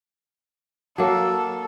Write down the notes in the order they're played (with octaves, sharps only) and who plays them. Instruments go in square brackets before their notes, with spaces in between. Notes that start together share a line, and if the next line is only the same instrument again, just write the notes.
[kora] F#3 A#3 [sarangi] A4